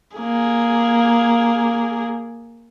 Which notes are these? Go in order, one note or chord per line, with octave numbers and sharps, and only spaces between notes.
A#3 G#4